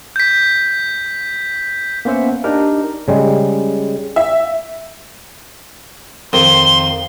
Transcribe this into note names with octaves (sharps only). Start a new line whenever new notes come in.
G6 B6
A#3 B3 C#4 C5 E5 F#5
D4 D#4 G4 A#4
C#3 G3 G#3
E5
F2 D#3 C6